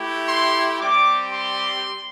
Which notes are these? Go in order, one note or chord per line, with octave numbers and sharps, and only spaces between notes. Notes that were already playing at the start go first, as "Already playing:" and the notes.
Already playing: A3 E4 G4
C6
G3 C4 G4 D6
C6